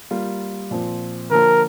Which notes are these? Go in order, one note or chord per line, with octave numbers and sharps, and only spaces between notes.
G3 A#3 F4
A#2 F3 C4
D3 F3 A#3 A#4